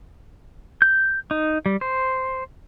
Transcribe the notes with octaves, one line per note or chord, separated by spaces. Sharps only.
G6
D#4
G3
C5